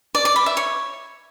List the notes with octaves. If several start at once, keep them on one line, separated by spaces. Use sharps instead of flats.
D5
D5
B5
E5
C#5